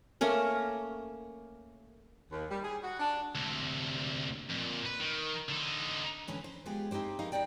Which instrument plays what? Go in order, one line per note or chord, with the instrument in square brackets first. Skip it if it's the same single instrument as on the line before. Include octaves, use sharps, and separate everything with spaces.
[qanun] A3 A#3 C#4 A#4
[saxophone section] D#2
G3
G#4
F#4
D4
[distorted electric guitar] D2 C3
F2 A#2
B4
D#3
D3 D#4
[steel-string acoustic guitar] D3 E3 C#4 B4
C5
G#3 B3 F4 G4 G#4
C4 D#4 E4 G4 C5
D#4 G#4 A#4 B4 D#5 F5
D#4 E4 F#4 D5 G5